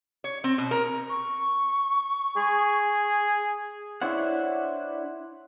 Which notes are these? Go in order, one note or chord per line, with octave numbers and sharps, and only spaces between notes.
C#5
C4
B2
A#4
C#6
G#4
D4 E4 C5 C#5 F#5